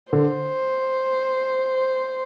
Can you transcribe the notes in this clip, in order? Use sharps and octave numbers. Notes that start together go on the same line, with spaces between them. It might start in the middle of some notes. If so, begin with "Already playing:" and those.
D3 C5